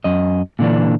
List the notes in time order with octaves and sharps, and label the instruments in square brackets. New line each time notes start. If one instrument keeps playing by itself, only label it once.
[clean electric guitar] F#2 D#5
A#2 D3 E3 D4